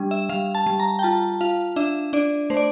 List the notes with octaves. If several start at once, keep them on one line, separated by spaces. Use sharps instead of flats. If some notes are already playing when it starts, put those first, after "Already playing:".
Already playing: G3 D4
E5
G3 F5
A5
G3
A#5
G5
F4 A5
F4 F5
D4 E5
D4 D5
A3 C5
D5